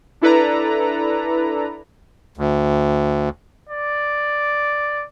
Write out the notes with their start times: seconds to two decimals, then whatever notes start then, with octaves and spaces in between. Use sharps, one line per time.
0.21 D4 E4 A4 B4 D5 A#5
2.37 D2
3.69 D5